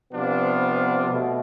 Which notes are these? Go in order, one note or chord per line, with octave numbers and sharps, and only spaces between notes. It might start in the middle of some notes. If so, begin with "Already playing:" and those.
C3 F3 B3 D4 F4
B2 A3